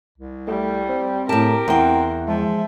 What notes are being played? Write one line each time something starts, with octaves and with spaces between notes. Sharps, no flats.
C2
G3 A3
C4
A2 G4 A#4 A5
E2 C4 F#5 G5
F3 G#3 E5